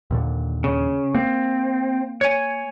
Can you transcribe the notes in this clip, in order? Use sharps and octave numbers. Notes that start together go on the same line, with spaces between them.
D#2 A#2 D3
C#3
A#3 C4
C#5 G#5